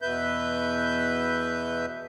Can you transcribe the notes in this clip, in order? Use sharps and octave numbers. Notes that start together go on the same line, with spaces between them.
E2 B2 B4 E5 G6